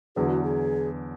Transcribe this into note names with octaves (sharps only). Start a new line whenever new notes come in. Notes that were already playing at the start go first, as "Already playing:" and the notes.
E2 D3 F#3 B3 G#4
F#4
G#4